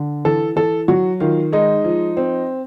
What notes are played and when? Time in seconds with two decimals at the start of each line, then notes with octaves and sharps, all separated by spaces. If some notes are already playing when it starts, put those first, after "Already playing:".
Already playing: D3
0.25 E3 A4
0.56 E3 A4
0.88 F#3 F#4
1.20 D#3 F4
1.53 G#3 D#4
1.85 F3
2.17 C4